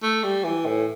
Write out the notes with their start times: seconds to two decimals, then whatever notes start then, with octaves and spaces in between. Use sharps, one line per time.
0.03 A3
0.23 G3
0.44 E3
0.65 A2